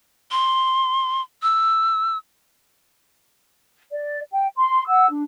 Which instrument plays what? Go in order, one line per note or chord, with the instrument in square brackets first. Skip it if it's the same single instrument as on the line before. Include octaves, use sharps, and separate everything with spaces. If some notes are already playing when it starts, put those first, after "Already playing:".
[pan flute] C6
E6
[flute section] D5
G5
C6
F#5 E6
D4